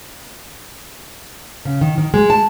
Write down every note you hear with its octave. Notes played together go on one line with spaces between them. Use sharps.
C#3
D#3
D#3
G#3
A5